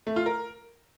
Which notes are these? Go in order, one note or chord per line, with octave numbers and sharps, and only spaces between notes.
A3
F4
A#4